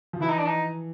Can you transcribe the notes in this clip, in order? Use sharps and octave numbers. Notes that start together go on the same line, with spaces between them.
F3
E3 E4
D#4
D4
D#4